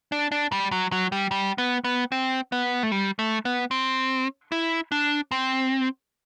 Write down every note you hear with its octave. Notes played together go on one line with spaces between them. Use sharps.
D4
D4
G3
F#3
F#3
G3
G3
B3
B3
C4
B3
A3
G3
A3
B3
C4
E4
D4
C4